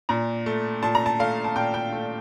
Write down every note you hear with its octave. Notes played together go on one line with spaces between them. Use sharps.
A#2 A#5
A3
A#2 A5
A#5
A5
A3 F5
A5
A#2 G5
G5
A3